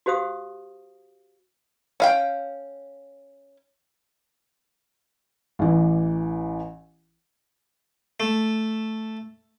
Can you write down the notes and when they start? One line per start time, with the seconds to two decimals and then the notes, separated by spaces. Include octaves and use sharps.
0.06 F#4 G4 C5 F5 D#6
2.00 C#4 F5 G5
5.59 A1 E3
8.20 A3